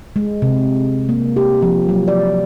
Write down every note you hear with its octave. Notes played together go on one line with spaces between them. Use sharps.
G#3
C3
A#3
G4
F3
F#3
D5